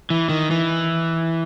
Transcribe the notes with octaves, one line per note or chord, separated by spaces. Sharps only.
E3
D#3
E3